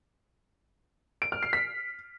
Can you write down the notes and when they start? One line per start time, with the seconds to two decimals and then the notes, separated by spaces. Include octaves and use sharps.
1.22 D7
1.32 F6
1.43 C7
1.53 B6